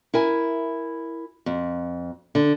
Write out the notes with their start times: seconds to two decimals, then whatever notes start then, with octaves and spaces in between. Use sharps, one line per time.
0.14 E4 A#4 G#5
1.46 F2
2.35 D3